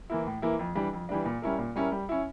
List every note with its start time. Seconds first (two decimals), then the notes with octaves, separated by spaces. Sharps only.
0.10 E3 A#3 E4
0.27 A2
0.42 E3 A#3 E4
0.59 F2
0.75 E3 G3 D4
0.93 F2
1.09 E3 G3 D4
1.25 A#2
1.42 G3 C#4 E4 A#4
1.59 A#2
1.76 G3 C#4 E4 A#4
1.92 G3
2.09 C#4 E4